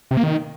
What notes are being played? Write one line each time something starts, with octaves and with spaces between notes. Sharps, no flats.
C3
A#3
D#3